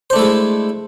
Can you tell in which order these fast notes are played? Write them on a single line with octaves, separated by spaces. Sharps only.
C5 D4 A3 E4 G#3